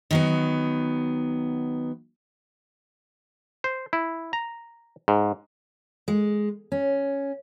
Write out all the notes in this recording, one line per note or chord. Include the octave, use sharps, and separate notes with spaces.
D#3 F#3 B3
C5
E4
A#5
G#2
G#3
C#4